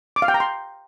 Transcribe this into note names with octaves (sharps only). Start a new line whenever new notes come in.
D6
F5
G5
A#5
C6